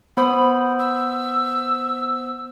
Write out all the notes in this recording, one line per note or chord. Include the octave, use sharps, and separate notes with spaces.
B3 C5 B5 D#6
E6